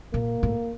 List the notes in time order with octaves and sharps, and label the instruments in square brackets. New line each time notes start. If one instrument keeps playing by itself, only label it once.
[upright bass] A#2 [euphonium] A#3
[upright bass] A2